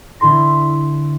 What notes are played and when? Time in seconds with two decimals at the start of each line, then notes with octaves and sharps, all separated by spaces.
0.20 D3 E4 A4 C6 A#6